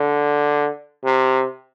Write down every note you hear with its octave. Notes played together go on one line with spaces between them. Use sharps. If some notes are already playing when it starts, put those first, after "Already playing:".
Already playing: D3
C3